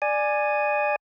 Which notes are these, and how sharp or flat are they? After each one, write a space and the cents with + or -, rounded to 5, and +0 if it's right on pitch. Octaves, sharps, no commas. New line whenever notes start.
D5 +15 G#5 +0